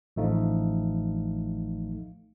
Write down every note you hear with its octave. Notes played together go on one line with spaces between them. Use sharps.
A1 F3 A3 D#4 F5